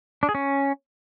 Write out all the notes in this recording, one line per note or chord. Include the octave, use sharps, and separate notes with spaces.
D4
G#4
C#4